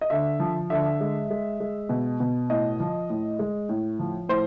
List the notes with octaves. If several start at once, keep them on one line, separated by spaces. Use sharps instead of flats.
D#5
D3 E5
F3
D3 E5
G#3
G#3
G#3
B2
B2
A2 D#5
F3
A2
G#3
A2
F3
A2 C5